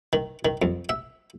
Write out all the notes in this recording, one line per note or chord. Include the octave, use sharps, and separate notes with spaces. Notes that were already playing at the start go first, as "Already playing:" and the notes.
D#3
D#3
F2
E5